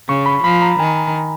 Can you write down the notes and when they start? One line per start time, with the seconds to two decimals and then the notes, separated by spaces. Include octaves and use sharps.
0.08 C#3 C#6
0.26 B5
0.43 F3 B5
0.62 A#5
0.79 D#3 G#5